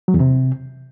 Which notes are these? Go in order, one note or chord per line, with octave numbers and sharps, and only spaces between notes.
F#3
E2
C3